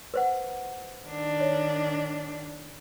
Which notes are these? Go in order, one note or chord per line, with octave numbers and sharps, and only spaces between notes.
B4 C5 F#5
D#3 D4
C#5